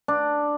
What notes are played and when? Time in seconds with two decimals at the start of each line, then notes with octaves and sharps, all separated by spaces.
0.08 D4